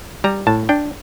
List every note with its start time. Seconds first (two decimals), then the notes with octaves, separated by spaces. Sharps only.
0.24 G3 A#5
0.47 A2 A5
0.69 D4 G5